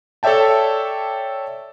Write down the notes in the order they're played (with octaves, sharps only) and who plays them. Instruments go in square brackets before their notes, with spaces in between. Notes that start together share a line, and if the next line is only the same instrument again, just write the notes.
[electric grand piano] A4 C#5 D5 E5 G5 A5